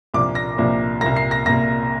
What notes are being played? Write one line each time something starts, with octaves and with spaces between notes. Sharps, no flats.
C2 A#2 F3 A#3 D4 D6
A#6
C2 A#2 F3 A#3 D4
C2 A#2 A#3 A#6
C7
A#6
C2 A#2 A#3 A#6